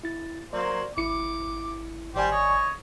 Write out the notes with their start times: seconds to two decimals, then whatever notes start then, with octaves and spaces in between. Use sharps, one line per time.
0.03 E4 A6
0.53 F#3 A#3 C5 D5
0.97 G#1 E4 D6 C#7
2.15 G#1 G3 G4 C5 D5 G#5
2.32 C#5 D#5 C#6